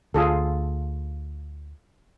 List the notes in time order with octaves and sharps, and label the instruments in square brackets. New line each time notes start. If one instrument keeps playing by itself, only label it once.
[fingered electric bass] D2 [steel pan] F4 G#4 A4